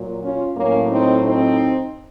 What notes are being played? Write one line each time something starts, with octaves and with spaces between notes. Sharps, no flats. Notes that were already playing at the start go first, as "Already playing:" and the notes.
Already playing: A#2 F#3
C#4 F4
A2 F#3 A#3 C#4
C4 D#4
C4 D#4